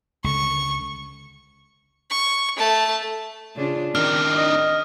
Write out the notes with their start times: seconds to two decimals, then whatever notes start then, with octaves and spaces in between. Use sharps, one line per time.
0.24 C#2 D3 C#6
2.10 C#6
2.57 A3 A5
3.56 C#3 D4 F4
3.95 D#3 D4 D#4 G4 A#4 F6
4.37 D#5